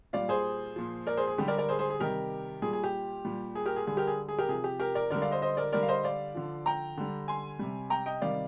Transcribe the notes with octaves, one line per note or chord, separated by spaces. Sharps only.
A#2 G3 D5 F5
G#4 C5
A#2 F3
A#4 D5
G#4 C5
G#4
D3 G3 G4
A#4 D5
A#4 D5
G#4 C5
G#4 C5
G#4
C3 D#3 G3 G4 A#4
A#2 G3 G#4
G#4
G4
A#2 G3
G#4
G4 A#4
G#4
D3 G3 G#4
G4 A#4
G#4
G#4
G4 A#4
C3 F3 G#4
G4
G4 A#4
A#4 D5
D3 G3 A#4 D5
D5 F5
C5 D#5
C5 D#5
A#4 D5
D3 G3 A#4 D5
F5
C5 D#5
D5 F5
D3 F3
G5 A#5
D3 G3
G#5 C6
C3 G3
G5 A#5
D#5 G5
C3 D#3 G3 D5 F5